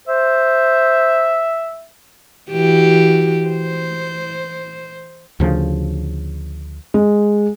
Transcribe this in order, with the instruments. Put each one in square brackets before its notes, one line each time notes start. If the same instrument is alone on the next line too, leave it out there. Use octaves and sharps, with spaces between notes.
[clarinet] C5 [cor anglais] E5
[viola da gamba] E3 F#4 G4
C5
[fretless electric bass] D2 C#3 F3
[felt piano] G#3